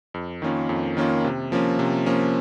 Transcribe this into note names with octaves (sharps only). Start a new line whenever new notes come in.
F2
D#3 A#3 C#4 F4
F2
D#3 A#3 C#4 F4
C3
F3 A#3 C#4
C3
F3 A#3 C#4